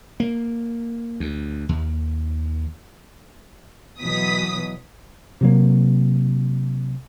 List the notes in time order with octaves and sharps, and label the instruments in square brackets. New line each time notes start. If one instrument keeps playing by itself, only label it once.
[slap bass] A#3
D2
D#2
[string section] B2 E3 F#3 D#6 B6
[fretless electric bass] C3 F#3 A#3